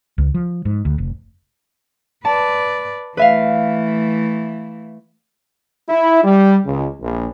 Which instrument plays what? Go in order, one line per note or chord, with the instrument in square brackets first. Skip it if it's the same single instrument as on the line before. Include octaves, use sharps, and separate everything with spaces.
[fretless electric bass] C#2
F3
G#2
D2
F1
[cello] B4 D5 [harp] A5
[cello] E3 A3 [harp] B4 E5 F5
[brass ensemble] E4
G3
C#2
A#1